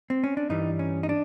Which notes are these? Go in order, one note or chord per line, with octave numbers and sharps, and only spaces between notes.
C4
C#4
D4
G2 E3 G3 D#4
C#4
D#4
D4